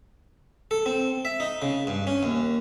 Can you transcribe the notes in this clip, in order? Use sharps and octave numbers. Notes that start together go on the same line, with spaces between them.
A4
C4
E5
D#4
C#3
G2
C#4
D#2